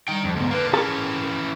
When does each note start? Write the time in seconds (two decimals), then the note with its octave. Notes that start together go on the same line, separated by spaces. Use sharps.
0.08 G3 D#4 G5
0.24 F2
0.36 D2 G#2 B3
0.51 D3 A#3 B4
0.73 E3 C#4 G#4 A#4 A5